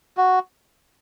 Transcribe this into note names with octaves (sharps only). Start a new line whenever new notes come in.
F#4